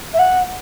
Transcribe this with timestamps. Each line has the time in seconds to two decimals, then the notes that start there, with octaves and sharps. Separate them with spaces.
0.14 E5
0.19 F#5